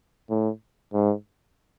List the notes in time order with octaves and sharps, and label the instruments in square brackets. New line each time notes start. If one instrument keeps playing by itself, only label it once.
[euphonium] A2
G#2